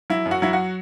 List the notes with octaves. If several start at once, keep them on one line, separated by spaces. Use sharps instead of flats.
F#3 E4
F#2
F#4
F#3 E4
F#4